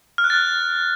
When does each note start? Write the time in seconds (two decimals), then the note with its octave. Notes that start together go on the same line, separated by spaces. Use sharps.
0.18 F6
0.24 F#6
0.30 A6